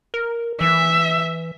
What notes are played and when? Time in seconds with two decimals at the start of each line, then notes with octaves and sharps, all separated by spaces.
0.14 A#4
0.61 E3 E5